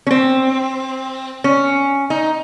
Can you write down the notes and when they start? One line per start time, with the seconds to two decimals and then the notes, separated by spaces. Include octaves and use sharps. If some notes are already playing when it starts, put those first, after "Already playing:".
0.07 C#4
0.11 C4
1.44 C#4
2.10 D#4